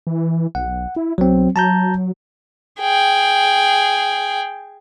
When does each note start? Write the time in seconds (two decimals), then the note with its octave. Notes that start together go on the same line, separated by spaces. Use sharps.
0.07 E3
0.55 B1 F#5
0.96 E4
1.18 B1 F#3 C4
1.56 F#3 A5 A#5 G6
2.81 G#4 G5